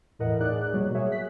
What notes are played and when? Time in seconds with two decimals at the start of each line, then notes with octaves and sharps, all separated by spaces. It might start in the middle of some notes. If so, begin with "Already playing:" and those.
0.19 E2 A2 E3 A#4 D#5 F#5
0.40 A2 D#4 G#4 D5 F#6
0.74 B2 F#3 G3 A#3
0.95 F#4 G#4 C#5 E5
1.11 F#6 B6